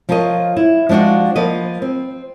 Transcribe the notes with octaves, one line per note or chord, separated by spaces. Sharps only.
F3 F4 A#4 C#5 D#5
E4
F3 G#3 D4 F4 F#4
F3 A#3 B4 D#5
C4